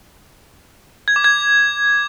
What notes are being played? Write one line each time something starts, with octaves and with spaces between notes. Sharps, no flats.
G#6
D6
G#6